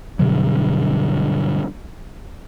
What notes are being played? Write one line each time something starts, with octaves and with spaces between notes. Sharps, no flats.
G2 B2 D3 F#3